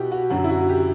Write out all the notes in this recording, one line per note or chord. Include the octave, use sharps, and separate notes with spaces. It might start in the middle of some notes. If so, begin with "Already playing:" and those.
Already playing: B2 E4 F#4 G4
F#4
F#2 D3 F#3 F#4
E4
F#4
G4